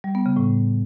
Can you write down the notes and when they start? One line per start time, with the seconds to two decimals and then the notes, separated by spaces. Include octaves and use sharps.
0.04 G3
0.15 B3
0.26 C#3
0.37 A2